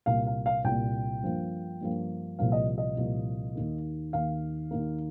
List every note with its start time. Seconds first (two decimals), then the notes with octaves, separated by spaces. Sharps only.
0.06 C2 A#2 A#3 F5
0.27 F5
0.46 F5
0.64 C2 A#2 A#3 G5
1.22 G2 F3 A#3
1.81 G2 F3 A#3
2.39 C2 A#2 F3 A#3 F5
2.52 D#5
2.78 D#5
2.97 C2 A#2 F3 A#3
3.55 D#2 D#3 A#3
4.13 D#2 D#3 A#3 F5
4.71 D#2 D#3 A#3